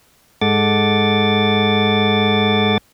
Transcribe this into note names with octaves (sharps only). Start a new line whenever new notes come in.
G#2 G#3 A4 F#5 D6 A6